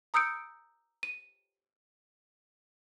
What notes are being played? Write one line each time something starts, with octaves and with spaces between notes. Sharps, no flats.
A#5 D#6 E6 G6 C#7 D7
D#7